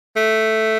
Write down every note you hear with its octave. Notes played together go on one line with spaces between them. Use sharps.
A3